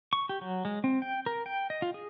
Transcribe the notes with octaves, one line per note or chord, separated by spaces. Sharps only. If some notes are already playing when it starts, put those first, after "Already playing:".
C#6
G4
F#3
G#3
C4
G5
A#4
G5
D#5
F4
G#4